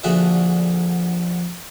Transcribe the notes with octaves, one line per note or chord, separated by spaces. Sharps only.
A#1 D3 F#4 G#4 E5